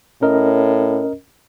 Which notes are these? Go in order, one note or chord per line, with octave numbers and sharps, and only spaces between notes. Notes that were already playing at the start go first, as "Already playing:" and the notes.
A2 C#4 A#4 D#5